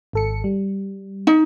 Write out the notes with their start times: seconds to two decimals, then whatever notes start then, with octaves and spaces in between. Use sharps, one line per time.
0.13 G#1 A4 C#7
0.44 G3
1.27 D#4